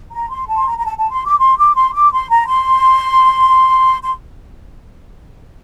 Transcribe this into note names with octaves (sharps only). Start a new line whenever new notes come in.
A#5
C6
A5
C6
A#5
A#5
A5
A5
C6
D6
C6
D6
C6
D6
C6
A#5
C6
C6